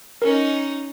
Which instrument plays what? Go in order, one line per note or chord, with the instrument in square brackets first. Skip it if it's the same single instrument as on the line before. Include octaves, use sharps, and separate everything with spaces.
[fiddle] C#4 D#4 [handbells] A#4